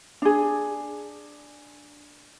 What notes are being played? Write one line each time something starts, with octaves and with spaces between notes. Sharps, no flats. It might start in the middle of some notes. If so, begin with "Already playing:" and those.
D4 G#4